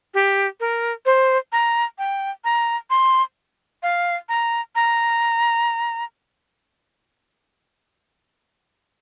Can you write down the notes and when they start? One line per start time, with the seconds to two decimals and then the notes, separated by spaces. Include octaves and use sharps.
0.14 G4
0.60 A#4
1.06 C5
1.52 A#5
1.98 G5
2.44 A#5
2.90 C6
3.83 F5
4.29 A#5
4.75 A#5